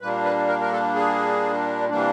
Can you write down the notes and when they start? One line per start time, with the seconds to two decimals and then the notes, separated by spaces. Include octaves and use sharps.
0.01 A#2 G3 A#3 D4 B4
0.25 B4
0.48 A#4
0.61 A#4
0.72 A4
0.95 G#4
1.89 C3 E3 G3 A#3 D4